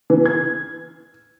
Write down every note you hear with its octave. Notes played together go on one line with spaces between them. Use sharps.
E3
G#6